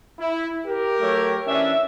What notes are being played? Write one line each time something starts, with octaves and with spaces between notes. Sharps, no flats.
E4
G4 A#4
F#3 A3 C#5
E3 C#4 D4 E5